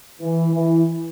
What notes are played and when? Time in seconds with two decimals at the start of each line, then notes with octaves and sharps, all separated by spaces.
0.21 E3
0.54 E3